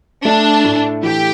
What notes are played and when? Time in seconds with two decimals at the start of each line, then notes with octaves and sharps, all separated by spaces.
0.25 A3 D4
0.64 A2
1.03 E3 G4